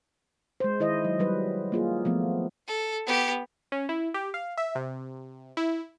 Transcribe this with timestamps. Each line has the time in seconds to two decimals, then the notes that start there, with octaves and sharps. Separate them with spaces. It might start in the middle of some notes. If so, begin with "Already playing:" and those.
0.60 G#3 C5
0.80 D#3 E4 C5 D#5
1.05 F#3
1.19 F#3 G3 B4
1.72 A#3 F4 G#4
2.05 F3 A3 B3
2.67 A4
3.07 B3 G4
3.72 C#4
3.89 E4
4.14 G4
4.34 F5
4.58 E5
4.75 C3
5.57 E4